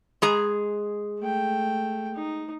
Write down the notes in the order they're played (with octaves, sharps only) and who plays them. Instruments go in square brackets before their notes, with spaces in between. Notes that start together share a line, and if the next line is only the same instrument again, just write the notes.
[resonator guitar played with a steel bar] G#3 G#4 A#5
[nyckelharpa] A3 G5
D#4